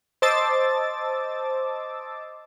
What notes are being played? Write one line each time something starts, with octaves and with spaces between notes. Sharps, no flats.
C5 D#5 A5 D6 E6 A6